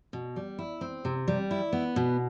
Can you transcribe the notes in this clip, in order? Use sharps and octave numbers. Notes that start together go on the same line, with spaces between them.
B2
G3
E4
C4
C3
G3
E4
B3
B2